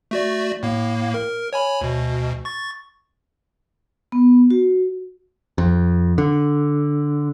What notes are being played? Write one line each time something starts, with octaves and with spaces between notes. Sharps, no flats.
A3 F#4 D5
A2 A#3
A#4
C#5 G#5 B5
D2 B2
C#6 A6
B3
F#4
F2
D3